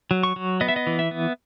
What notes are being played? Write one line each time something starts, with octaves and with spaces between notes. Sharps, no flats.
F#3
C#6
F#3
B3 D#5
E5
D#5
E3
E5
B3